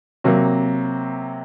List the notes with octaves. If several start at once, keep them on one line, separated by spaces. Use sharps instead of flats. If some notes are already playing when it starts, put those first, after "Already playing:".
C3 F#3 A#3